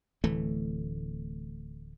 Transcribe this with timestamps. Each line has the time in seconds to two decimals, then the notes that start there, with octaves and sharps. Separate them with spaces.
0.24 D1 E3 A3